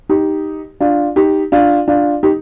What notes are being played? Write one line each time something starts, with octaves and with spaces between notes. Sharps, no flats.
D#4 G4
D4 F4
D#4 G4
D4 F4
D4 F4
D#4 G4